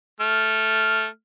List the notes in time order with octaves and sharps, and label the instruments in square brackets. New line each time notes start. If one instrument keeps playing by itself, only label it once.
[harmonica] A3 F6